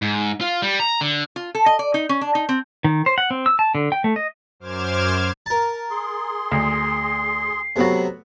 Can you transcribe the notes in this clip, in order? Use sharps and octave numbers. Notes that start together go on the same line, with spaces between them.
G#2
F4
G3
A#5
D3
F4
A4
D#5
D5
D#4
C#4
D4
D#4
C4
D#3
C5
F#5
C4
E6
A5
D3
G5
A3
D#5
F#2 C5 D6 F6 G#6 E7
A#4 A5
G#4 C6
D2 C7
C3 F#3 A3 B3 F#4